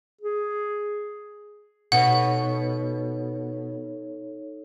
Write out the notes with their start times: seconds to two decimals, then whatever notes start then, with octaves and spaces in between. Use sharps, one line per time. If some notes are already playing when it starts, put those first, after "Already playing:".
0.21 G#4
1.92 B2 D#4 A4 C#5 F#5